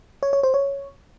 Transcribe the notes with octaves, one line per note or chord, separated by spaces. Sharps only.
C#5
C#5
C5
C#5